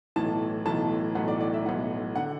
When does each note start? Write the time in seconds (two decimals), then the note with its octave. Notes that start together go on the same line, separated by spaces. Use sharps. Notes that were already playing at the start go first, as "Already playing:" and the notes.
0.16 B1 A2 E3 A5
0.66 B1 A2 E3 A5
1.15 B1 A2 E3 F#5
1.28 D5
1.41 D5
1.54 E5
1.65 B1 A2 E3 F#5
2.16 D3 F#5